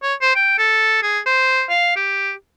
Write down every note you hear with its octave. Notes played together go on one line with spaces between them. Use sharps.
C#5
C5
G5
A4
G#4
C5
F5
G4